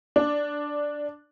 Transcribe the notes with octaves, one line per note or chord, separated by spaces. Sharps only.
D4